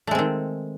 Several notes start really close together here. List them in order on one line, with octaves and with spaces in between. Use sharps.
A3 G#3 C4 D#3